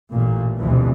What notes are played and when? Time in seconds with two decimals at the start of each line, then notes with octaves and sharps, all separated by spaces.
0.11 A1 A#2
0.57 F1 D2 B2 E3